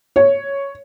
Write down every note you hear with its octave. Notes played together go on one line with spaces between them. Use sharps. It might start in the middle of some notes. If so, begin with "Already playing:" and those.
C#5